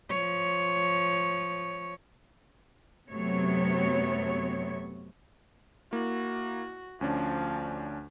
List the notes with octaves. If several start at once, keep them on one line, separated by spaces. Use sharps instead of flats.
F3 C#5
F#2 C3 F#3 A3 B3 C#5
A#3 E4 F#4
D2 F3 C#4 D4